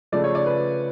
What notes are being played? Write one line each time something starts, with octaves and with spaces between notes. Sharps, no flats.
C#3 F3 A3 D5
C#5
D5
B4